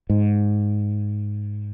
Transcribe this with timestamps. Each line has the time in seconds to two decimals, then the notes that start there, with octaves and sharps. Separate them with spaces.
0.10 G#2